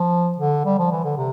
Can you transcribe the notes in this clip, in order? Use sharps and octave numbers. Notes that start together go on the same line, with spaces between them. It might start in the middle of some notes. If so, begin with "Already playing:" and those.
Already playing: F3
D3
G3
F3
E3
D3
C3